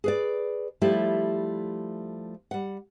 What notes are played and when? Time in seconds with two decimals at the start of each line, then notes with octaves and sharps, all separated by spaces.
0.04 G#4 B4 D5
0.81 F3 G3 A3 E4 G4
2.51 G3 F#5